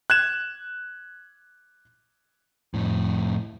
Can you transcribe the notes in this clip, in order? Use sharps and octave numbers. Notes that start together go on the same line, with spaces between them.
F#6 G#6 E7
F2 A2